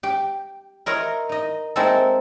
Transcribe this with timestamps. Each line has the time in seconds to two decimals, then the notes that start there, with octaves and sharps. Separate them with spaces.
0.03 G4 G5
0.86 E4 F4 A#4 C#5 D#5 F5
1.29 D#4 D#5
1.76 G#3 A#3 C4 D#4 E4 A4